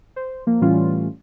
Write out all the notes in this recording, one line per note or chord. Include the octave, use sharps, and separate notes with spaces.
C5
F3 A#3
A2 E3 G3 A3 C#4 F4